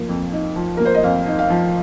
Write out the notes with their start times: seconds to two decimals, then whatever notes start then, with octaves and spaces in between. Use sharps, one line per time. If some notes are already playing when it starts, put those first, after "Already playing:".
Already playing: F3 A#3
0.09 F2
0.32 D#4
0.56 F3
0.77 A#3 A#4
0.86 C5
0.95 D#5
1.03 F2 F5
1.27 D#4
1.39 F5
1.50 F3